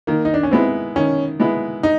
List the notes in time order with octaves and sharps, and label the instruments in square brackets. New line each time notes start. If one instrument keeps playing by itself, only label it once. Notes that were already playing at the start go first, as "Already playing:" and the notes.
[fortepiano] D#3 [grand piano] A#3
[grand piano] D#4
D4
C#4
[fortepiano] G#3 B3 E4 [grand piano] C4
[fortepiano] D#3 [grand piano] C#4
[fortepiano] G#3 B3 E4
[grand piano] D#4